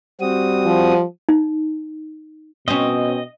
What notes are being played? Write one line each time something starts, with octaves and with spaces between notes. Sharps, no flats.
G3 C4 F#4 D#6
F3
D#4
B2 C4 C#4 D#5